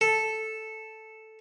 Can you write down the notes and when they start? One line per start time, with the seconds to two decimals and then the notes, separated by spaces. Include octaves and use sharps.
0.01 A4